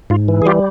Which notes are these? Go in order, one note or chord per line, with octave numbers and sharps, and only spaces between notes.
G#2 F4
E3
G#4
G3 F4 G4